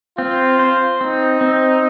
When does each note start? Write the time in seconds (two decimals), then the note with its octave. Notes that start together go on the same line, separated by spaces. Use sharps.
0.18 C4 F4
0.59 C5
1.01 C4 D#4
1.41 C4